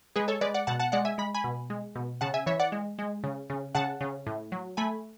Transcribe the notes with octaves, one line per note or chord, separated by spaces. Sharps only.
G#3 G#4 B4
A4 C#5
G#3 B4 D5
D5 F#5
B2 F#5 A5
F#5 A5
G#3 D5 F#5
E5 G#5
G#3 B5
G#5 B5
B2
G#3
B2
C#3 F#5 A5
E5 G#5
E3 C#5 E5
D5 F#5
G#3
G#3
C#3
C#3
C#3 F#5 A5
C#3
A2
F#3
A3 G#5 B5